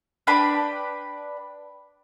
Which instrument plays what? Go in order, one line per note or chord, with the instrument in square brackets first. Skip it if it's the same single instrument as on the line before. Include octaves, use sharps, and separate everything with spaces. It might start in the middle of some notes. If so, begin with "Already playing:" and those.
[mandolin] D4 B4 G5 B5